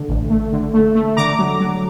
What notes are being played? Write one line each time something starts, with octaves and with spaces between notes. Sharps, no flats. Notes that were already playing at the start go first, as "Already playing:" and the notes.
Already playing: D3 A3
A1
A3
D3
A3
A3
D3 A#5 D6
F#3
F#3